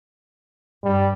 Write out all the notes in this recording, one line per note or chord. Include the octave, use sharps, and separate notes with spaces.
G2 G3